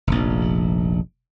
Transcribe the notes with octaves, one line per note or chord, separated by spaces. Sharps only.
F1 A#1